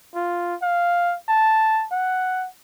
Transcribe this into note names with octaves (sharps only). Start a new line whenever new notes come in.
F4
F5
A5
F#5